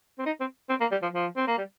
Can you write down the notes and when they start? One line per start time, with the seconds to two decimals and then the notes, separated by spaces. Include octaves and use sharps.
0.18 C4
0.26 D#4
0.40 C4
0.69 C4
0.80 A#3
0.92 G3
1.02 F3
1.13 F3
1.37 C4
1.47 A#3
1.58 G3